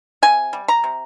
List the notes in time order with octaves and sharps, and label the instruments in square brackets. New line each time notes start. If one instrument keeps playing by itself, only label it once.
[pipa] C3 G#5
G3
A#5
C3